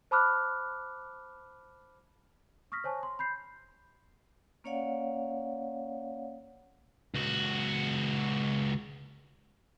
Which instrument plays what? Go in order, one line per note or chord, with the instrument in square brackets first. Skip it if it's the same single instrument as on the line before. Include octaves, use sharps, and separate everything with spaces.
[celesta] C5 A5 B5 D6 F6 F#6
C#6 D#6 F6 A#6 B6
C5 C#5 G#5 A5 C#6
C6
B5 G6 C7
[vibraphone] A#3 C#4 C#5 D5 F5 F#5
[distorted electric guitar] C#2 F#4